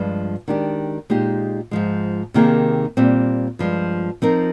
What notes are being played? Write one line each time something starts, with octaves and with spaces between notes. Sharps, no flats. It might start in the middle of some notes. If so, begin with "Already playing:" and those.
Already playing: G2 F3 G#3
D#3 G#3 D4 G4
A#2 G#3 D#4 G4
G#2 F3 G#3
C3 D#3 A#3 D#4 G#4
A#2 G3 C4
G2 F3 G#3
F3 C4 D#4 A#4